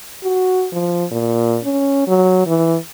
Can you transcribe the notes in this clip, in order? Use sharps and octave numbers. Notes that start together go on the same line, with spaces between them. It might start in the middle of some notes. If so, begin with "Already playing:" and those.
F#4
F3
A#2
C#4
F#3
E3